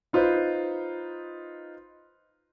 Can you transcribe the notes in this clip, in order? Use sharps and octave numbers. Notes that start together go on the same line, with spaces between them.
D#4 F4 B4 C5